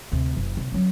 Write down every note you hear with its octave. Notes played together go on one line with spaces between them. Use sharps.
D2 C3
F#1
C3
F#3 C#4